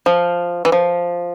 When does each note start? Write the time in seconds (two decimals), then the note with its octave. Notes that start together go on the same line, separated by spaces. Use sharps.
0.06 F3
0.65 E3
0.72 F3